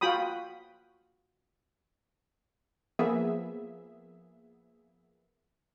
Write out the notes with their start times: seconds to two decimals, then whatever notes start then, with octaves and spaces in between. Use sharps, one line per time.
0.01 F4 F#4 G5 B5 D#6
2.99 F3 A#3 B3 G#4 E5